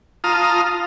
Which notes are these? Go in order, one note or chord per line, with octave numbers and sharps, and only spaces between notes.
F4 A5 A#5 D#6 F6